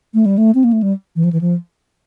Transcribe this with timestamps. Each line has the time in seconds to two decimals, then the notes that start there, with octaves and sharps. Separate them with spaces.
0.14 A3
0.26 G3
0.38 A3
0.55 C4
0.64 A#3
0.72 A3
0.82 G3
1.16 E3
1.24 F3
1.32 E3
1.41 F3